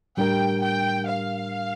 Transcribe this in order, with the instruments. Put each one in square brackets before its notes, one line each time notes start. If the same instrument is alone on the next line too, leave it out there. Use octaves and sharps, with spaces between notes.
[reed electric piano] A2 G3 D4 G4 A#4 [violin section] G5
[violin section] G5
F5